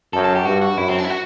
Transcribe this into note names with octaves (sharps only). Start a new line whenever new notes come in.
F#2 A4
A4
G4
G2 F#4
F#4
F#2 E4
C4
D4
E4
F#4